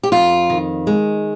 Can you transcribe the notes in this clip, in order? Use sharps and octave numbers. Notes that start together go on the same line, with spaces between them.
G4
F2 F4
D#3
G#3